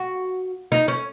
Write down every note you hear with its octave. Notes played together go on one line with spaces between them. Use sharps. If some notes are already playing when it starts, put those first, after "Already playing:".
Already playing: F#4
D#4
C#4